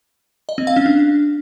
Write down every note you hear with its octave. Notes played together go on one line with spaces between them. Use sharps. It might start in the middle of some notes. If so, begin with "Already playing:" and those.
D#5
C4
F5
C#4
D4